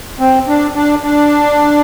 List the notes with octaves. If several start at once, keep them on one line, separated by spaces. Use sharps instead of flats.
C4
D4
D4
D4